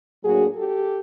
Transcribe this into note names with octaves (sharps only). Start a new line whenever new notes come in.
A2 F#3 A#3 D4 F#4 G#4
G4 A4